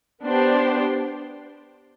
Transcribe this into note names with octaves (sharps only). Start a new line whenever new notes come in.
B3 D4 G4 C5